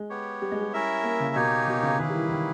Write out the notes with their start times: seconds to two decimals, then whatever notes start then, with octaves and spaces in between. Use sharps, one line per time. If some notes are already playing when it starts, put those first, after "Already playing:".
Already playing: G#3
0.10 B3 G4 C#5
0.42 G3
0.52 G#3
0.62 G3
0.73 C#4 E4 A#4 E5
1.04 A#3
1.20 C#3
1.35 B2 A#3 D#4 G4 C#5 G#5
1.67 B2
1.83 C#3
1.98 D#3 A#3 C#4 E4 G#4 B4
2.10 G3
2.14 E3
2.30 D#3